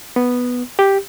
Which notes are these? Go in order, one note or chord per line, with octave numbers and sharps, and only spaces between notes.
B3
G4